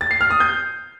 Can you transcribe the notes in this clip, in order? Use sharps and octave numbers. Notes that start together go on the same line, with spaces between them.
A6
C7
F6
D#6
G6